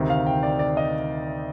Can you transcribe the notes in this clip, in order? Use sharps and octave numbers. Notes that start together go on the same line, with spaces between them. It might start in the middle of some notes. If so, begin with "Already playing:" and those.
Already playing: D2 C3 D#3
F5
G5
D5
D5
D#5